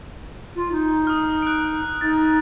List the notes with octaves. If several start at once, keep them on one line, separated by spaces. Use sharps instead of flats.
F4
D#4
D#6 F6
F#6 D7
D#4 A6